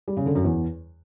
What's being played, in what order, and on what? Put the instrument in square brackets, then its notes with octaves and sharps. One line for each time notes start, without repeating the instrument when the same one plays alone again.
[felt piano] G3
C#3
D3
F#2
E2